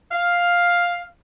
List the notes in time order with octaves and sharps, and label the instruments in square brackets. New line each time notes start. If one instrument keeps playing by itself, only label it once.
[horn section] F5